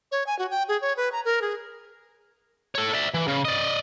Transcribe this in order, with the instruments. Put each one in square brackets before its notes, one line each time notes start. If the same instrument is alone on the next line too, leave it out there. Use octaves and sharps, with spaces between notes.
[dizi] C#5
G#5
F#4
G5
G#4
C#5
B4
A#5
A#4
G#4
[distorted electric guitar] A4 C#5
D5 E5
E3
C#3
D5 D#5